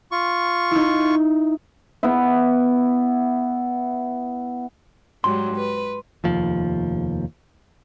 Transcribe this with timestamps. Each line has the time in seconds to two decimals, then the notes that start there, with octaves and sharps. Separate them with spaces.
0.12 F4 C#6
0.71 D#4 E4
2.03 B3 E4
5.24 G#2 F#3 G3 C6
5.55 B4
6.24 F1 D#2 F3